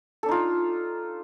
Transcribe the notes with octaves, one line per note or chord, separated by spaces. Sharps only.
D4 D#4 F4 A4